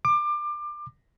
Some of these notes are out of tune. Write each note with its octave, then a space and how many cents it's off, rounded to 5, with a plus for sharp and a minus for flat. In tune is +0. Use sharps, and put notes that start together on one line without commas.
D6 +25